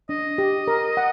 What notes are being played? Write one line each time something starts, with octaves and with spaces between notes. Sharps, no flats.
D4 D#5
G4
A#4
F#5